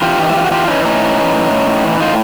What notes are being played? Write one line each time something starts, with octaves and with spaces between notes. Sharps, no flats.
E3 F4 G4
E3 D#4
E4
E3 F4
F#4
E3 F4 G4
E3 C#4 D#4
A2 C#4 D#4
E3
E3
A2
A2
A2
E3
A2 D#4 F4